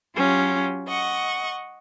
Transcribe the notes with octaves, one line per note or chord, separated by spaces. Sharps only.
F#3 C#4 F4 G4
D#5 F#5 C#6